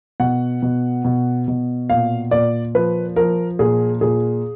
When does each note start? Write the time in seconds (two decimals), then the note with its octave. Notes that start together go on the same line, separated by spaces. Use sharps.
0.20 B2 F#5
0.63 B2
1.05 B2
1.48 B2
1.90 A#2 F5
2.31 A#2 D5
2.75 F3 B4
3.16 F3 A#4
3.59 A#2 G#4
4.01 A#2 G#4